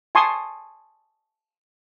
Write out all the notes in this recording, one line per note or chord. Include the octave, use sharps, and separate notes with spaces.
G#5 A5 C6 C#6 D#6